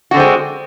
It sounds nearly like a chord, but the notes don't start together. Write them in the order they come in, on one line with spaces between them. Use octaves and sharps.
F#4 D3 C4 G#3